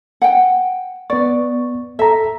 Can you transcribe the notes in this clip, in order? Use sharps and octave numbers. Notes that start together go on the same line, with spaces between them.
F#5 G5
B3 D5 C#6
A4 E5 A#5